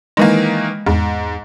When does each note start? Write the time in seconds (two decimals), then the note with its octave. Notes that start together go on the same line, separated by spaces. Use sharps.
0.17 D#3 E3 G#3 A#3
0.86 E2 G#2